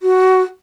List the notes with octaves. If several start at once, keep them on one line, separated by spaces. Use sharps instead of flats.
F#4